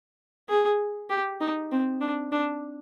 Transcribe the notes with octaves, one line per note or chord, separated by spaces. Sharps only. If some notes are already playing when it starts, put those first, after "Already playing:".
G#4
G4
D#4
C4
D4
D4